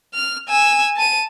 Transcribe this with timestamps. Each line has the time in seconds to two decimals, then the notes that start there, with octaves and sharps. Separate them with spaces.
0.14 F6
0.49 G#5 E6
0.96 A5 D#7